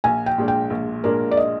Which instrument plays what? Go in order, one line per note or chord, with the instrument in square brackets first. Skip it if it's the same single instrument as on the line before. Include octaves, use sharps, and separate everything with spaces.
[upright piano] A#1 [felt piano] G#5
[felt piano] G5
[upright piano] A#2 G#3 D4
[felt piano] G5
[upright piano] A#1
[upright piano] A#2 G#3 D4 [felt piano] A#4
[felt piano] D5
D#5